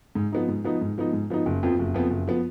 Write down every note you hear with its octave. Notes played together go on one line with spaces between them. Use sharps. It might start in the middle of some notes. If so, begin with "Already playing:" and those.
G#2
F3 B3 D#4
G#2
F3 B3 D#4
G#2
F3 B3 D#4
G#2
F3 B3 D#4
F#1
F2 F3 B3
F#1
F2 F3 B3
F#1
F3 B3